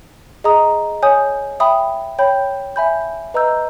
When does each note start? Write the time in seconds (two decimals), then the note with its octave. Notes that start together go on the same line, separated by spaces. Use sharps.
0.44 G#4 D#5 A#5 D#6
1.02 C#5 G#5 D#6 G6
1.60 E5 G5 B5 D#6
2.19 C#5 G5 B5 G6
2.76 E5 G#5 B5 G6
3.34 B4 D#5 A#5 E6 G6